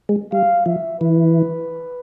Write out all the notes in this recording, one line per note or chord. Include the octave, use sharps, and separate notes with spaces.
G#3
G3 F5
F3 E5
E3 B4